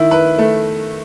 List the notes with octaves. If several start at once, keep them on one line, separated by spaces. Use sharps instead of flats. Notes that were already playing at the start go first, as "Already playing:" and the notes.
Already playing: D#3 E4
B4
A3